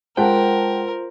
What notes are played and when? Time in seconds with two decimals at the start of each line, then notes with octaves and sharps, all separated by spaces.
0.17 G#3 F4 A#4 C5 F#5 G5 A5